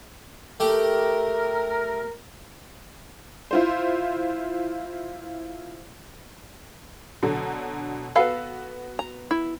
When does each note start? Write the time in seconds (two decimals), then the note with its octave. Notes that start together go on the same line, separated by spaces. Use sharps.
0.60 A3 G4 A#4
3.51 E4 F4 C5
7.23 B2 D3 F#3
8.16 B3 F#4 A4 B4 F5 B5
8.99 A#5
9.31 E4